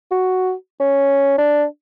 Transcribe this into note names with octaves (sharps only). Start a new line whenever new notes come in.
F#4
C#4
D4